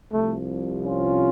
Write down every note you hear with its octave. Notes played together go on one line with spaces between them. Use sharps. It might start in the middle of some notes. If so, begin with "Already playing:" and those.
C2 C3 F3 A3
C#4 F4